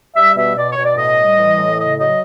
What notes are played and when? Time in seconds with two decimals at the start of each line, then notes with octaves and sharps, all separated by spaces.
0.16 G3 E5
0.36 B2 E5
0.57 B2 D5
0.70 C#5
0.76 B2
0.83 D5
0.96 A2 D#5
1.18 G3
1.37 E3
1.58 A2
1.78 C#3 D#5
1.98 F#3 D#5